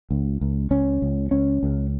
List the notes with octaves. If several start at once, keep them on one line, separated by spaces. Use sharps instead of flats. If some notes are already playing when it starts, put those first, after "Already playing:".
C#2
C#2
C#2 C#4
C#2
C#2 C#4
C#2